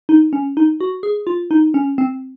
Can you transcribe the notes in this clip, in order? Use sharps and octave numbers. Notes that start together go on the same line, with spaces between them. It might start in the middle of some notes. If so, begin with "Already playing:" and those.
D#4
C#4
D#4
F#4
G#4
F4
D#4
C#4
C4